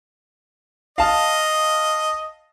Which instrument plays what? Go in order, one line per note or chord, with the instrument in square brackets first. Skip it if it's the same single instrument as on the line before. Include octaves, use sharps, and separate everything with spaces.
[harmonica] D#5 [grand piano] F5 A5